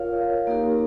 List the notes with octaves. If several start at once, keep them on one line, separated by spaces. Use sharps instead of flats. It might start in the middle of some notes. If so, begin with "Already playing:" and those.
Already playing: F4 A#4 C#5 F5
A#3 D#4 G4 A#4